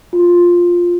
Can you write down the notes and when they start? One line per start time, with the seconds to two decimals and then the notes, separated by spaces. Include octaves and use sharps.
0.13 F4